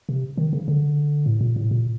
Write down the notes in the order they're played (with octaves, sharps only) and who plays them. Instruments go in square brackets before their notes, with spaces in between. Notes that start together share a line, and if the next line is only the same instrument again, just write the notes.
[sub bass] C3
D#3
C#3
D3
A2
A#2
A2
A#2